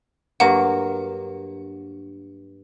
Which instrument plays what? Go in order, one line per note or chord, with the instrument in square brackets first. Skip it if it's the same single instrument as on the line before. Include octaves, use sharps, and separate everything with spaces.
[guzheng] G2 F#3 A#3 [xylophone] F#5